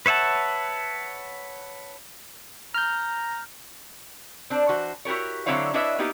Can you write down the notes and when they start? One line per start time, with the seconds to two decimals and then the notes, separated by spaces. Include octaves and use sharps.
0.06 B4 C#5 E5 F#5 A5
2.74 A#5 F6 G6
4.50 C4 D4
4.69 E3 F#4 C5
5.05 E4 F#4 G4 A#4 C#5
5.46 D3 F#3 C4 E4 C#5 F5
5.74 D4 E4 B4 C#5 D#5 E5
5.99 A#3 B3 D#4 E4 G4